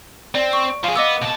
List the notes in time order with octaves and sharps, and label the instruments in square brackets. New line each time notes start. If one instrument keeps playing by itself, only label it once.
[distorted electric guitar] C4 [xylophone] D5
[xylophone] C#6
[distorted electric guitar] F3 G#4 [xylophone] F5
[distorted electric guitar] B3 [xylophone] D#5 D6 E6
[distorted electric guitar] B2 A5